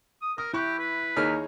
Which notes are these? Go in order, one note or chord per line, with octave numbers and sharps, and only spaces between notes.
D#6
A#4 D#6
E4 G4 B5 C#6 F#6
B4
D#2 D#4 G#4 A#4 C#5 F6